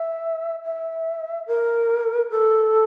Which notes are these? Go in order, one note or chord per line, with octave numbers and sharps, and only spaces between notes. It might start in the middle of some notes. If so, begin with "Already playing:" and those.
Already playing: E5
E5
A#4
A4